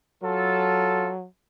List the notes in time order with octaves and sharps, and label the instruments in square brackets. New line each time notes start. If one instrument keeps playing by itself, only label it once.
[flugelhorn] F#3 [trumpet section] F4 A4